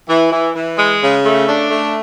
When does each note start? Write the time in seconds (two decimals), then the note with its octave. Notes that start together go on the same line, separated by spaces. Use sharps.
0.09 E3
0.32 E3
0.55 E3
0.79 G#3
1.02 C#3
1.25 A3
1.48 D4
1.70 A3